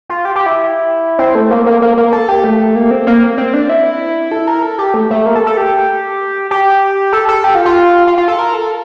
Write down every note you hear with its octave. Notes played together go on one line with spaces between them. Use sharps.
F4
G4
G4
E4
C4
A3
A#3
A#3
A#3
A#3
A4
G4
A3
A#3
C4
A#3
C4
D4
E4
A4
A#4
A4
G4
A3
A3
A#3
A4
A4
G4
G4
A4
A4
G4
F4
F4
F4
F4
A4
A#4
A4